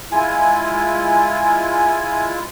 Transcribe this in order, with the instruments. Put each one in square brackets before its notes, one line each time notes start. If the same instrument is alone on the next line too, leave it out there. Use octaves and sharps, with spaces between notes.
[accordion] G#3 E4 F4 [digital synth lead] G#5